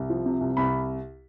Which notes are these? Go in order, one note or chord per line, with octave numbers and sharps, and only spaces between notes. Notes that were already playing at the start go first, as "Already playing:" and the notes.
Already playing: C2
F3
C3
C2
C2 B5